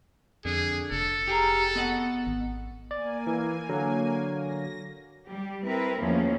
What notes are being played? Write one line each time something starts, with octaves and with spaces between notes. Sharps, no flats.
F2 D3 G#4
F1 A4
G4 G#4 A#4
B3 D#5 F#5
G#1
A#3 D5 G#5
E3
D3 F#3
A#6
G3 G4
C4 E4 A#4 B4
E2 D#3 F3 A3 A#3 C#4